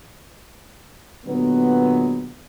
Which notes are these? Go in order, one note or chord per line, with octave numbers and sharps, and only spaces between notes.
A#2 D3 F#3 G#3 B3